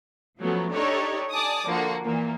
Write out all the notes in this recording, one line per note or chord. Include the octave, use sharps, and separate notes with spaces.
F3 F#3 A3 B3 C#4
D4 D#4 G4 A4 C#5 D5
D5 G#5 A5 D6 D#6
D3 F3 A#3 F#4
A#2 E3 A#3